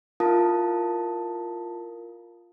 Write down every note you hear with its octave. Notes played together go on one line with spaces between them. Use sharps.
E4 F4 A#4 F5 A5 D#6